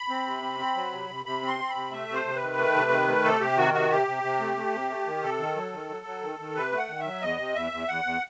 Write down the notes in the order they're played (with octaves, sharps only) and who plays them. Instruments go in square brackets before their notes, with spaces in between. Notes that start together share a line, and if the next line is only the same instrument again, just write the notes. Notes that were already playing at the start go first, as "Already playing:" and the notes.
Already playing: [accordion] B5
C4
C3
C4
C4
F#3
C3
C3
C3 B5
C4
C6
C4
B5
C3
A3 E5
C3
C5
C3
B4
D#3
A3
C3
D#3
A3
C3 A4
C3 G4
D#3 F#4
C3 F#4
C3 G4
C3
C3
A3
A3
C3
A3
D#3
C3 A4
D#3
F#3
D#3
F#3
F#3
D#3
D#3
C3 B4
A3
F#5
D#3
E5
F#3
E2 D#5
C3
E2 E5
E2
E2 F#5
E2